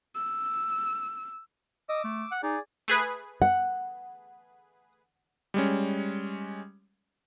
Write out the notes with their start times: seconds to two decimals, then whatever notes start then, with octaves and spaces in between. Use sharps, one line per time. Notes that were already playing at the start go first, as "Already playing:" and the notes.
0.16 E6
1.89 D#5 D6 E6
2.04 A3
2.32 F#5
2.43 D#4 G#4 D5
2.88 A3 G#4 B4
3.42 F#5
5.54 G3 G#3 C#4